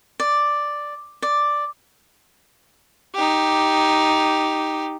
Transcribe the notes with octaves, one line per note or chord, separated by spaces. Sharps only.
D5
D5
D#4 G4